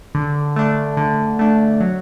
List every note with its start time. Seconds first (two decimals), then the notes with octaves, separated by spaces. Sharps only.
0.15 D3
0.56 A3 D4
0.97 D3
1.39 A3 D4
1.80 F#3